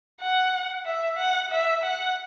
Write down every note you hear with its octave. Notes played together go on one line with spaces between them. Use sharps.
F#5
E5
F#5
E5
F#5